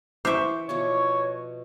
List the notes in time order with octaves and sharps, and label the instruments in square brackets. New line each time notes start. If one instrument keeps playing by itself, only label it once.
[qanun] E3 [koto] C5 E5 [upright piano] C#6 D6
[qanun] B2 F3 D5 [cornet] C#5